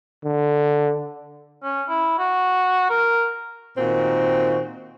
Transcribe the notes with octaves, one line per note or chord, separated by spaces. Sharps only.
D3
C#4
E4
F#4
A#4
A#2 D#3 C4 F#4